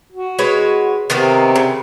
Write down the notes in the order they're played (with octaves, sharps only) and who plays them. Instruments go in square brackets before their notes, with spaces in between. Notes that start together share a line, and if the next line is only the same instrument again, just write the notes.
[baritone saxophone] F#4
[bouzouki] G#3 B4 C#5
[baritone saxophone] C3 [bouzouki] D#3 A#3 B3
[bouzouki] C#3